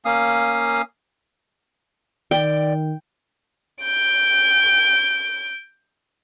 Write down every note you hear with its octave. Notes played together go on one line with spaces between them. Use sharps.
A#3 C#4 F5 D#6
D#3 D5 G5
G6 D7